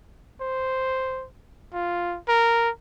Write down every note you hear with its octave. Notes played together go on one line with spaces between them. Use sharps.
C5
F4
A#4